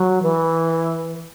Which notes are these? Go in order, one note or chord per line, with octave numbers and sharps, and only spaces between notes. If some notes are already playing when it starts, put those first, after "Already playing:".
Already playing: F#3
E3